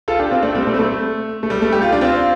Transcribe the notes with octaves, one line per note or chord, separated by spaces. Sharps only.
F4 A4
D4 G4
C4 F4
A3 D4
G3 C4
A3
C4
A3
A3
G3
A3
G4
F4
D4
C4 F4